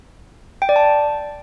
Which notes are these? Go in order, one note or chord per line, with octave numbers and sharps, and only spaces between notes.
G5
D5
A5